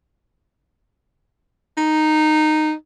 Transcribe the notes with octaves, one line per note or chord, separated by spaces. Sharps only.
D#4